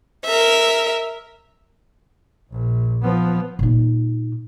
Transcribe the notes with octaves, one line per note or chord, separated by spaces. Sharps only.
A#4 E5
A#1
F3 B3
A#2 D#4